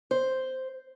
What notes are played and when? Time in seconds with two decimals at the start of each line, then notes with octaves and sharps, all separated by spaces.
0.11 C5